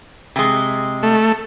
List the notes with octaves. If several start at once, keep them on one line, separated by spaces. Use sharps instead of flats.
C3 G#3
A3